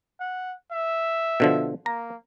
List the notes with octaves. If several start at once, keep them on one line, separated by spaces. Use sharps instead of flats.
F#5
E5
B2 D3 F3
A#3 A#5